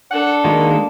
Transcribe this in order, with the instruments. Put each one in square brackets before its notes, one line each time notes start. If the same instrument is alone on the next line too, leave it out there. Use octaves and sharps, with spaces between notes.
[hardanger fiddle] D4 A4 [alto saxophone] F#5
[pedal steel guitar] D#3 G#3 A#3 [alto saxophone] F#4